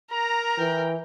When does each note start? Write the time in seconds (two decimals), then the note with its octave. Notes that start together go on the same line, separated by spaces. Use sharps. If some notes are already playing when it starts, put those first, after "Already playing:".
0.12 A#4 A#5
0.59 E3 G5